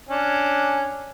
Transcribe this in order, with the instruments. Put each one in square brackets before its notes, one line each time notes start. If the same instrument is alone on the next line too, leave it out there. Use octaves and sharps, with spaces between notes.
[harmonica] C#4 D4